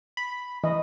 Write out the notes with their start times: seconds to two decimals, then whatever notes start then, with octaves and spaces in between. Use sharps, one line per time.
0.17 B5
0.64 E3 D#5